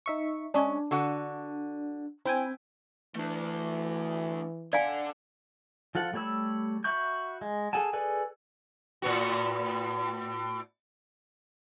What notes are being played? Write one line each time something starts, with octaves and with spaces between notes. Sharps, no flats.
D#4 E5 C#6
G#3 C#4 D4
D3 F#4 F#5
C4 E4 G5 G#5
E3 A3 D4
D3 D5 F5 F#5 G#5
F3 F4 A4 F#5
G3 A3 C#5 B5 E6
F#4 E5 B5 C#6 G6
G#3
G#4 A4 F#5 G#5 A5
G#4 A4 B4 D5 G#5
A2 B3 F#4